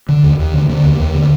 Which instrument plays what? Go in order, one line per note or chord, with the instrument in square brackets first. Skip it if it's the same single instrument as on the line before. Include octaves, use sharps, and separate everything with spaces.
[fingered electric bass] D3
D#2
D#2
D3
D3 A#3
D#2
D#2
D3